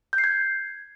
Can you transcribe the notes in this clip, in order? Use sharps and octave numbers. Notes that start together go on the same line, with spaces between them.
G6
C7
G#6